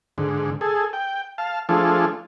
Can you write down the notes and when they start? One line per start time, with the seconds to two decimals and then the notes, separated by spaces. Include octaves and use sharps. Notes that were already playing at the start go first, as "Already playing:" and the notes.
0.18 G#2 D3
0.61 G#4 A4
0.93 G5
1.38 F5 A5
1.69 F3 A3 D4 F4 G#4 A4